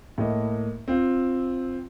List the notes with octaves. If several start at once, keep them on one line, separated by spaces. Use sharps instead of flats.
A2 A#3 D#5
C4 F4